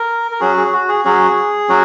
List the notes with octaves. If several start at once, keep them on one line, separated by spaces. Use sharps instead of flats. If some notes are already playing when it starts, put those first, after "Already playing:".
Already playing: A#4
A#4
F#3 C#4 F#4 G#4
G#4
F#4
G#4
F#3 C#4 F#4 G#4
F#3 C#4 F#4